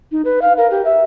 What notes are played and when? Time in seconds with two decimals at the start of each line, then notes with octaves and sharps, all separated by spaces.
0.12 D#4
0.25 B4
0.42 F5
0.57 A#4
0.71 G4
0.85 E5